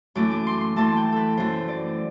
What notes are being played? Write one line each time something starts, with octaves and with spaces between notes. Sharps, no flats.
F#2 E3 A3 D6
D6
C6
C6
F#2 E3 A3 A5
G5
A4 B4
F#2 E3 A3 C5
D5